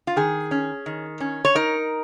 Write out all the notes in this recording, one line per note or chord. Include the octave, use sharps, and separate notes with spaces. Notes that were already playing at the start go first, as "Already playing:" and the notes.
F4
D#3 G#4
C#4
D#3
C#4
C#5
D#4 A#4